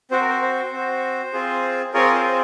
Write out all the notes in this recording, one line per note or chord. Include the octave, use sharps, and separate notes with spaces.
C4 F#4 C5
A#4
C5
C5
C4 F#4
C4 F4 G#4
C4 F4 G#4 A#4 C#5
C5